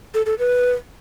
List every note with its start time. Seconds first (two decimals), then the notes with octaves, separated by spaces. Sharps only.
0.14 A4
0.26 A4
0.39 B4